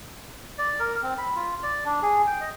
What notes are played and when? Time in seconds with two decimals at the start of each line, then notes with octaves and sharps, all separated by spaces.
0.58 D5
0.80 A#4
1.03 C4
1.18 B5
1.35 F4
1.63 D5
1.85 D4
2.02 G#4
2.27 G5
2.41 D#5